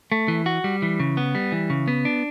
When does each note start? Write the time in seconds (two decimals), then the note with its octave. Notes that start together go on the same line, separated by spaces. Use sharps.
0.12 A3
0.28 E3
0.46 F#4
0.64 G3
0.82 E3
1.00 C#3
1.17 B3
1.35 G3
1.52 E3
1.70 C#3
1.88 B3
2.05 D4